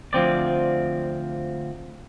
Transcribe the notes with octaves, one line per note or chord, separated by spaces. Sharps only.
D2 F3 C4 D5